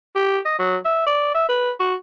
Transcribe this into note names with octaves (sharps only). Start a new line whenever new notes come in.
G4
D#5
F#3
E5
D5
E5
B4
F#4